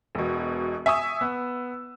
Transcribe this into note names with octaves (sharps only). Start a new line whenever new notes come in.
E1 B2
E5 G#5 C#6 D#6 E6
B3